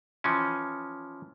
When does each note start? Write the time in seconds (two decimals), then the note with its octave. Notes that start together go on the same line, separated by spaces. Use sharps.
0.24 E3 F3 C#4